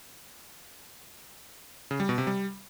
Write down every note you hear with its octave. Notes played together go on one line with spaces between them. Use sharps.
C#3
G3
B2
C3
G3